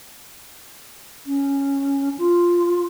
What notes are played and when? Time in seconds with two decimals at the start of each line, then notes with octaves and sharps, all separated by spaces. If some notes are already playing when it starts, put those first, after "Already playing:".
1.26 C#4
2.18 F4